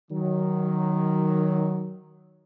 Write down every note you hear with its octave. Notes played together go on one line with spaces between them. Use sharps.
D#3 F#3